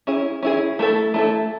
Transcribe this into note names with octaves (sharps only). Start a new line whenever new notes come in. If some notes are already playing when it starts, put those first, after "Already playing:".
C#4 E4 G#4
C#4 E4 G#4
A3 E4 A4
A3 E4 A4